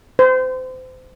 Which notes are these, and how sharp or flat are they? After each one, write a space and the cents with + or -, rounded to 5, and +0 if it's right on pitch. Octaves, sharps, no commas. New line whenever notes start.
C5 -30